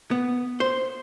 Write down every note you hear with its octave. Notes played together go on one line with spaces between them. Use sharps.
B3
C5